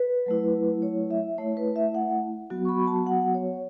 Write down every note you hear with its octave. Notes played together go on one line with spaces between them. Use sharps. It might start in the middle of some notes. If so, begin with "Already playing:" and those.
Already playing: B4
F#3 A3 E4
C#5
E5
A3 E4 C#5
B4
E5
F#5
F#3 B3 F#4
C#6
B5
A5
F#5
C#5